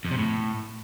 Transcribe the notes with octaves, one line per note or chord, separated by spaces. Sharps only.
F2
C3
A2